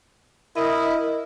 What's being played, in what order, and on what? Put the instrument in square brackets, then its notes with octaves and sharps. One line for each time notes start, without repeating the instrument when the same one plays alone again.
[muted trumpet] E4 [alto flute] A#4 [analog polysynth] D#5